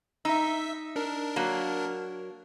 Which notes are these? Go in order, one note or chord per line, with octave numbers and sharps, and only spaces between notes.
D#4 E5 E6
D4 A#4
F#3 A#3